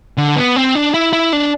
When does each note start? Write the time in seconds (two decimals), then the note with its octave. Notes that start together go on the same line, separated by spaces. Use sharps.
0.18 D3
0.36 B3
0.56 C4
0.75 D4
0.94 E4
1.13 E4
1.33 D4